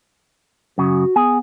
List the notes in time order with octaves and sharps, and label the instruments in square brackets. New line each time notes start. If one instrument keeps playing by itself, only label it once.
[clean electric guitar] F#2 C#3 [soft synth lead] F#4
[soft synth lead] B3 [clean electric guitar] G#4